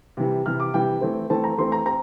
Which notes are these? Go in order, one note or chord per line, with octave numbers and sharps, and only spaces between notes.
C3 E3 G3
C3 E3 G3 F6
D6
C3 E3 G3 G5
E3 A3 C4
E3 A3 C4 A5
A#5
E3 A3 C4 C6
A#5
C4 A#5